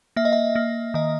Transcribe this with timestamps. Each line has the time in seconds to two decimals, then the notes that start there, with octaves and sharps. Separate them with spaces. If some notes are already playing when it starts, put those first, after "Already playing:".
0.16 A#3 E5
0.25 D#5
0.33 E5
0.56 A#3
0.94 D#3 D#5